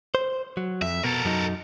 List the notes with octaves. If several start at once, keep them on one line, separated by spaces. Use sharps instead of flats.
C5
F#3
F2 E5
B2 A4 A#4
F#2 F#3 D#4